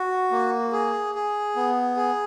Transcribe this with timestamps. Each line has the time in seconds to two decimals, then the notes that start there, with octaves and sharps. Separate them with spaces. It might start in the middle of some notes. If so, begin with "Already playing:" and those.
Already playing: F#4
0.31 A#3
0.73 G#4
1.15 G#4
1.56 B3
1.96 G#4